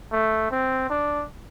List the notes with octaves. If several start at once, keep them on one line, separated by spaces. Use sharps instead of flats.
A3
C4
D4